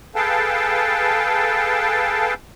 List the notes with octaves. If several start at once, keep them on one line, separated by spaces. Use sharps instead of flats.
G#4 A4 B4 F5 G5 A5